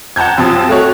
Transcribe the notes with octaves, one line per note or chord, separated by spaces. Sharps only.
F#5 A5 A#5 G6 G#6
F#2 C3 F3 A5 D#6
A3 F#4 C#5